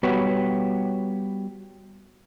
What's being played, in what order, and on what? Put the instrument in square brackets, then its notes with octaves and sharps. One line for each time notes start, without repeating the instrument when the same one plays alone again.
[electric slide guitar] G3 B3 F#4 G4 B4 C#5